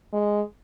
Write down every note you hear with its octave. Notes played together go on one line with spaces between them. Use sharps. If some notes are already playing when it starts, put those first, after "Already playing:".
G#3